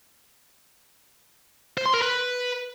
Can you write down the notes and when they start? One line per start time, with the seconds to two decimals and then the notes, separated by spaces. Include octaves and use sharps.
1.78 C5
1.86 C6
1.94 A#4
2.02 B4